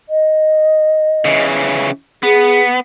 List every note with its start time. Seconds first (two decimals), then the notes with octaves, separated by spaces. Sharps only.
0.09 D#5
1.25 C#3 E3
2.23 B3 G#4